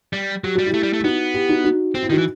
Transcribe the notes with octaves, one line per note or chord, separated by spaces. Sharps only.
G3
F#3 G4
G3 F#4
E4 G4
A3
G3
A3
E4
B3 D#4 F#4
E4 G4
D#4 F#4
D#4 F#4
C4 F#4
E4
D#3 D#4 F#4
E3